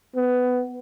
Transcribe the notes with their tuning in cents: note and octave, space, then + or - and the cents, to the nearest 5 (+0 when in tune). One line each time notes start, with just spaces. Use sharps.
B3 +15